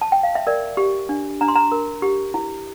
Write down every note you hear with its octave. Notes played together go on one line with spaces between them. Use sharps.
A5
G5
F5
E5
A#4 D5
G4
D4
D4 A#5
C6
A#5
A#4
G4
E4